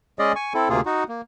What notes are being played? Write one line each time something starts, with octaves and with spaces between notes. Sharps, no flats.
G#3 C#4 G#4 D5 D#5
G#5 C#6
C4 E4 A4
D2 C3 A#3 F4 G#4
D#4 F#4
A#3